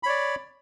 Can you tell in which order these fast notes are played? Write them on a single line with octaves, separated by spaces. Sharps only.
B5 C#5 D5